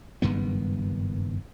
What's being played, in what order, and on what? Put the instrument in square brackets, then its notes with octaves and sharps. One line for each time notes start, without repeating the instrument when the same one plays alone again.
[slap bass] F#1 G2 D#3 B3